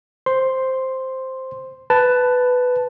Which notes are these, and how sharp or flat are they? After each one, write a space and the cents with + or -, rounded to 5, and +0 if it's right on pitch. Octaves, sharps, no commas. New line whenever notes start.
C5 +0 C6 +0
B4 +10 A5 +0